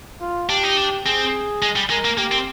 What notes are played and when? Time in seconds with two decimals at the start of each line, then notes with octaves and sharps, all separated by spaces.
0.21 F4
0.49 D4 G4
0.63 D#4
0.77 D4
1.05 C4 G#4
1.62 G#3
1.76 G3
1.90 G#3 A#4
2.05 A#3
2.18 A#3 G4
2.32 C4